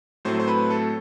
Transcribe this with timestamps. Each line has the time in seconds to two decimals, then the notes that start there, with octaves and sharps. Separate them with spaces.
0.25 A2 F#3 A3 C4 C5
0.40 C5
0.48 B4
0.70 A4